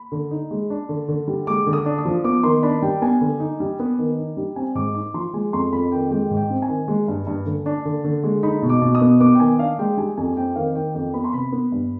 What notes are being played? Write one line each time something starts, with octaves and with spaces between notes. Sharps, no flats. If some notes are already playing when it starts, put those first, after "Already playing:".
Already playing: B5
D3
D#4
G#3
D4
D3
D3
G3
G#3 D6
D3
D#6
D4
D#6
F3
B3 D6
D#3 C6
D4 B5
G3 G5
B3 G#5
D3
D#4
G3
B3
D#3
D#4
G3
C4 G#5
G#2 D6
D#4 D6
F3 C6
G#3 G#5
F2 C6
F2 B5
D#3 G5
G#3 G5
G#2
G5
C4
G#5
D#3
G#3
G2
G2
D3
D4
D3
D3
G#3
D#4 B5
B2
D6
B2
D#6
B3
B3 D6
G5
D#3 G#5
D4 F5
G#3 G5
G3 G#5
F2 G#5
C4 G5
D#3 F5
D#3 G5
F2 G5
B3 B5
C6
C3 B5
B3
G2